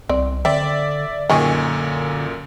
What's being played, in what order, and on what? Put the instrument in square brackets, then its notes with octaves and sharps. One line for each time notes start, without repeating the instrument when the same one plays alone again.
[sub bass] C2 [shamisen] C4 D5
[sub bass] D3 [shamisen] C4 [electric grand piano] D5 E5
[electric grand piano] F#2 A#2 [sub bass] D3 [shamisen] D#3 G#4